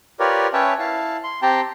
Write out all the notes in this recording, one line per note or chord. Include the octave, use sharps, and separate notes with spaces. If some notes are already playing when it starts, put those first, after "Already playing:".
F4 G4 A#4 B4 C#5 D5
C#4 B4 C#5 E5 G5 A5
E4 F5 A5
C6
C4 G4 G5 A5 A#5 C6